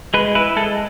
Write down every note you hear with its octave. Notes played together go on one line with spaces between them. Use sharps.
G#3 B4
E4 B4
G#3 A4